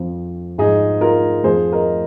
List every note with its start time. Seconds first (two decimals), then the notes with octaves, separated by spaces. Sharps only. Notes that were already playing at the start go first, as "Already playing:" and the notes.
Already playing: F2 F3
0.58 G#2 F3 D#4 G#4
1.01 F4 A#4
1.44 F2 F3 G#4 C5
1.72 A#4 D#5